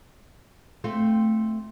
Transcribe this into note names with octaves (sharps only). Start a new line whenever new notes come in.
A3 C4 F4